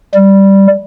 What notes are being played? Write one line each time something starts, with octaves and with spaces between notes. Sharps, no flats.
G3